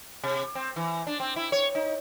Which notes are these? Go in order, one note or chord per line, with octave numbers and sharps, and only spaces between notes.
C3
C4
E3
D4
C4
E4
C#5
D#4